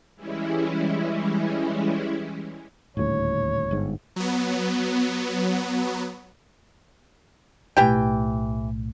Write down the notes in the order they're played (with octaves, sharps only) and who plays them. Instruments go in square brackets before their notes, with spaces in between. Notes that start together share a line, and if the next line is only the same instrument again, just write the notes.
[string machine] E3 G3 G#3 C#4 E4
[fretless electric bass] D#1 D2 A2 [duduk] C#5
[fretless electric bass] G1 G#2
[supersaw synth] F#3 B3
[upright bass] B1 A2 [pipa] E3 G4 G5